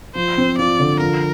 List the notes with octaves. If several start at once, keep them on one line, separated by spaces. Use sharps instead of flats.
F3 C5
C4
F4 D5
D3
F3 A#4